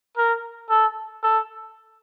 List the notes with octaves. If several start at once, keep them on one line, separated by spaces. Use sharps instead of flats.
A#4
A4
A4